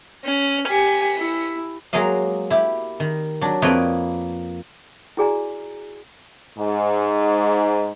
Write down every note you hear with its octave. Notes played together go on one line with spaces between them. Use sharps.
C#4
G4 G#5 B6 C#7
E4
F#3 G#3 A#3 D#5 F5
E4 G4
D#3
F#3 D4
F2 A#3 B4 C#5 D#5 G5
E4 F#4 G#4 D5 G#5 A#5
G#2